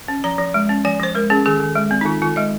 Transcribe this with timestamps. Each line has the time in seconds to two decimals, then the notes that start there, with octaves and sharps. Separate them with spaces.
0.08 C#4
0.24 F3 A#5
0.38 F3
0.54 G#3
0.69 C#4
0.85 F3 G#5
1.00 F3 C5
1.15 G#3 A#4
1.30 C#4 G#4
1.46 D#3 G#4
1.60 D#3
1.76 G#3
1.91 C4
2.01 D#4
2.05 D#3 F4
2.22 D#3 F4
2.36 G#3 D#5